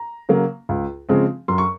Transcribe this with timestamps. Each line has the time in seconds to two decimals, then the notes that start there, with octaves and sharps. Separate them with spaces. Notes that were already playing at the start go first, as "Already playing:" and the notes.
Already playing: A#5
0.29 C#3 F#3 A#3
0.69 C#2
1.09 C#3 F3 G#3 C4
1.48 F#2 C6
1.58 C#6